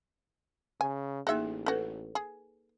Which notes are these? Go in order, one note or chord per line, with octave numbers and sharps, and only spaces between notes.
C#3 G#5
A1 A#3 D#4 F#4 G#4 E5
C#4 F#4 A4 B4
G#4